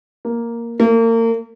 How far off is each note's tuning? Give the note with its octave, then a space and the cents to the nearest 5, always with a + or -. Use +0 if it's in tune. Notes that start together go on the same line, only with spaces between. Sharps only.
A#3 +0
A#3 -35